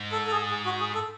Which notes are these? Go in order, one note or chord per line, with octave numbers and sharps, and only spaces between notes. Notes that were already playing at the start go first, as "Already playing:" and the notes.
Already playing: G#2
A4
A4
G#4
G#4
F#4
G#4
A4